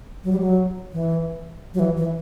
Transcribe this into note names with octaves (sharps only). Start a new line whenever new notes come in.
F#3
G3
F#3
E3
F#3
E3
E3